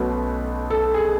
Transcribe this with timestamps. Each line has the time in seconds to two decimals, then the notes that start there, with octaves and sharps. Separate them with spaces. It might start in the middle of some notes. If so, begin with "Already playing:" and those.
Already playing: B1 B2 A3 C#4 B4
0.70 A4
0.94 G#4